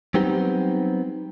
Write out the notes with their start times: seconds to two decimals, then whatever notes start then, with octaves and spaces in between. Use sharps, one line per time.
0.14 F#3 G3 B3 C4 D#4 G4